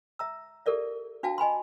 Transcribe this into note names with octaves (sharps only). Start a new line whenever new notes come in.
E5 A#5 E6
G4 A4 A#4 D5 E5
D4 F#4 F5 G5 A5
D#5 G#5 B5 C6